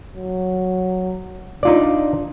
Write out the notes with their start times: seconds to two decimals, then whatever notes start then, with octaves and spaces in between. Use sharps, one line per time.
0.16 F#3
1.63 D4 D#4 F4 D5